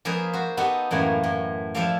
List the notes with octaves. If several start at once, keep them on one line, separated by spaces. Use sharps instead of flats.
F3 A#3 G#4 A#4 B4 D#5
F#4 C5
B3 D#4 F#4 G4 A4
F#2 A2 E3 A#3
A2
F3 E4 G4 A4 D5 F5